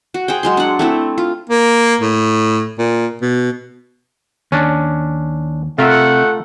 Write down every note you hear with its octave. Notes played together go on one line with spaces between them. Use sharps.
F#4
G#4 C5 G5
F#3 G#3 C6
D4 F#5
A3 C4 E4
F4
A#3
A2
A#2
B2
D#2 C#4 D4
C3 A3 F4 A#4 E5 F#5